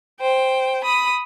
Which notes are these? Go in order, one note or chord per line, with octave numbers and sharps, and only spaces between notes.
C5 G5
B5 D#6